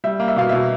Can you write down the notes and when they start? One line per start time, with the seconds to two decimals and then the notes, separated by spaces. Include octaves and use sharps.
0.04 G3 E5
0.20 A#3
0.28 E5
0.36 B2 F5
0.49 B2 E5